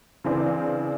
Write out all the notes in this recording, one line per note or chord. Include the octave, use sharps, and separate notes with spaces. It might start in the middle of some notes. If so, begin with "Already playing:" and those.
C#3 E3 C4 D4